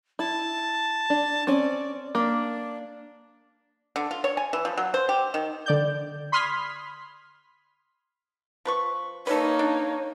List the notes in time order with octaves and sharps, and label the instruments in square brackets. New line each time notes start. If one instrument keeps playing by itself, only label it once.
[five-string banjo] E4 [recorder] A5
[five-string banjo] D4
[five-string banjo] C4 C#4 [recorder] D5
[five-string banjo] A#3 [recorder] D4
[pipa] D3
F4
C#5
G#5
E3
F3
F#3
C5
G4
D#3
[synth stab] D3 D5 G6
B5 C6 D#6 F6 G#6 B6
[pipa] F3 B4 C#6
[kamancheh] A#3 D#4 [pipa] A4 B4 [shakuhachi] C#5
[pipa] D4